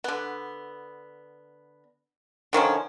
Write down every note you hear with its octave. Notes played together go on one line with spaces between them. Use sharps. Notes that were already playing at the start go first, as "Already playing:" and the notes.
D3 B3
D3 D#3 F3 C#4